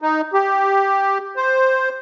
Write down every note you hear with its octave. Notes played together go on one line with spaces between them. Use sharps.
D#4
G4
C5